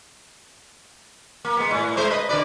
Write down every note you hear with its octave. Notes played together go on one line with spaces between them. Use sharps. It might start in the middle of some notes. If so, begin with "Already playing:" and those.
A#3
G#3 B3
A2
G#3 C5
B4 D#5
D3 B4 D5